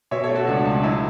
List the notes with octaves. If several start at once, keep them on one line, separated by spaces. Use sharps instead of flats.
B2 C#5 E5
A4 C#5
A3
F#4 A4
C#2 D4 F#4
C#2
D4
F#3 E4